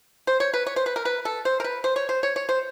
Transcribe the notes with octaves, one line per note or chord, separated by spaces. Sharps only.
C5
C#5
B4
C#5
C5
B4
A#4
B4
A4
C5
A#4
B4
C5
C#5
C5
C#5
C#5
C5